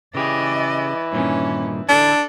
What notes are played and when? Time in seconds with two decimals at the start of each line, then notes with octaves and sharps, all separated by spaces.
0.15 C#3 E3 G4 G#4 D5 D#5
1.13 G2 A#2 D#3 C#4
1.89 D3 D4 E4 A4